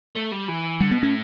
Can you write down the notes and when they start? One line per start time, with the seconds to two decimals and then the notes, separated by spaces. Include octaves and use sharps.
0.15 A3
0.32 G3
0.48 E3
0.80 D3 G3
0.91 B2 B3
1.03 A2 C#4